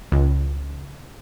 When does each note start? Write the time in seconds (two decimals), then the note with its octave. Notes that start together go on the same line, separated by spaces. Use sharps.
0.12 C#2